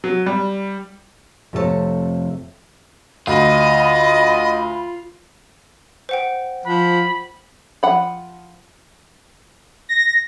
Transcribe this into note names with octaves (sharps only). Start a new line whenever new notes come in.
F#3
G3
F2 C3 A3 B3 A4 C#5
D2 F4 D#5 B5
C5 F#5 G5
F3 B5
F3 F#5 B5
A#6